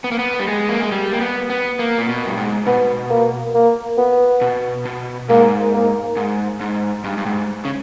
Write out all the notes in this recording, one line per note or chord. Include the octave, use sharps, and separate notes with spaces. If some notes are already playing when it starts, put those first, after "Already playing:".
B3
A#3
B3
G3
G#3
A#3
G#3
G3
A#3
B3
B3
A#3
A#2
B2
G2
G#2
B2 B3
A#3
A#3
B3
B2
B2
G#2 A#3
A#3
G#2
G#2
G2
G2
G#2
C#3